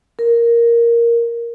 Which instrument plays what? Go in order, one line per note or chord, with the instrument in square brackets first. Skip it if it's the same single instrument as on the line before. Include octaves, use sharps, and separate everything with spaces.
[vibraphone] A#4